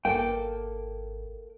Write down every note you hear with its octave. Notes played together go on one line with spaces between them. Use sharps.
G#1 A#3 A4 G5